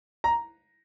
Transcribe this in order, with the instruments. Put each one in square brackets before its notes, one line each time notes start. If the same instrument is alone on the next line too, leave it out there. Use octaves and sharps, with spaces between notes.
[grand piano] A#5